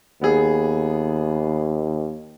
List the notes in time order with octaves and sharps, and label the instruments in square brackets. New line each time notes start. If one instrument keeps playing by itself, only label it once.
[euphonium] D#2 [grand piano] B3 G#4